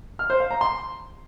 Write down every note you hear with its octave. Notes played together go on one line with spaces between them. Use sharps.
F6
C5
F5
A#5
C6